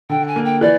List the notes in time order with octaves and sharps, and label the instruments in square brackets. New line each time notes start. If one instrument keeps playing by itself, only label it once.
[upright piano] D3 [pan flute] G5
[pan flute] G#5
[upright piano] A#3
[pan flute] G5
[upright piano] E3 [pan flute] D5